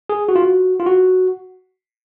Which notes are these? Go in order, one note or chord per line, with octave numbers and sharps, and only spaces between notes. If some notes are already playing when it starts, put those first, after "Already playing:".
G#4
F#4
F4
F#4
F4
F#4